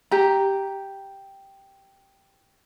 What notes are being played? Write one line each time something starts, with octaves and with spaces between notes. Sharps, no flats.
G4 A#5